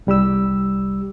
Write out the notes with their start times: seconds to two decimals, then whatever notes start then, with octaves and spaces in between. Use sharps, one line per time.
0.07 C2 G3 G4 E6